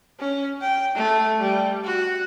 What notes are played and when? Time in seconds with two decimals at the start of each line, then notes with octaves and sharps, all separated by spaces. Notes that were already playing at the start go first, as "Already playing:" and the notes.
0.20 C#4
0.61 G5
0.95 A3
1.39 G3
1.84 F#4